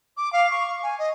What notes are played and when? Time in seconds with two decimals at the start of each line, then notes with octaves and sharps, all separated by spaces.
0.17 D6
0.33 F5
0.51 C#6
0.67 C#6
0.83 G#5
0.98 D#5